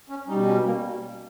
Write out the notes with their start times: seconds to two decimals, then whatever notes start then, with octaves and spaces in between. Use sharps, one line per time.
0.09 C#4
0.28 G3 D#4
0.33 B2
0.46 C#4
0.65 A#3